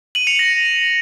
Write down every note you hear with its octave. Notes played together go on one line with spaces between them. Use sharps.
D#7 F#7
C#7 F7
A#6